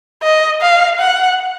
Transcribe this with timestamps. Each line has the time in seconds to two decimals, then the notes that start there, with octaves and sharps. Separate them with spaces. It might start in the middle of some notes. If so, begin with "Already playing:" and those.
0.23 D#5
0.62 F5
1.00 F#5